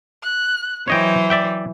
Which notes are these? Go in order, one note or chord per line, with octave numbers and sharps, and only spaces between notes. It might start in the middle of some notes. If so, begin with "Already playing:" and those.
F#6
E3 F#3 C5 C#5 D#5 G5
D5 E5 G5